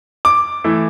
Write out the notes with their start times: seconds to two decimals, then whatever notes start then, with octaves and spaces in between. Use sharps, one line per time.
0.25 D6
0.64 E3 A3 E4